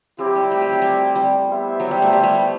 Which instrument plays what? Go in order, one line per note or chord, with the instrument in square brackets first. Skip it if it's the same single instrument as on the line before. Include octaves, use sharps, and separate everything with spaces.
[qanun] F#3 [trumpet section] C4 E4 G4
[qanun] G3
A3
G3
F#3
G3
G3
[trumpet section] B3 E4 G4 C5 E5
[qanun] F#3
G3
A3
G3
G3
A3